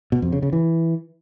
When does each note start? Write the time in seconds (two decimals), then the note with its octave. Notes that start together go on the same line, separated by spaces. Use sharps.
0.12 B2
0.22 F2
0.32 C#3
0.43 C#3
0.53 E3